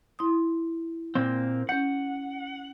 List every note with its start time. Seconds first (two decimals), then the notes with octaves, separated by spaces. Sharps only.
0.19 E4 C6 D#6
1.15 A#2 A#3 C4
1.69 C#4 F#5 G6